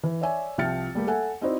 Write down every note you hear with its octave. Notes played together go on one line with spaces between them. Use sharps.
E3
C#5 D5 E5 G#5
C2 F3 G5 F6 A6 C#7
G3 A3 A#3 G4
A4 E5 F#5 G#5
C4 D#4 E4 F#4 C5 D5